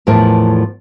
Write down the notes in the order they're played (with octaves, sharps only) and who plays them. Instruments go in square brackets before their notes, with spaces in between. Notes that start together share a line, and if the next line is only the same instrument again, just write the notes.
[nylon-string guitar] E2 A2 F3 E4 A#4 A5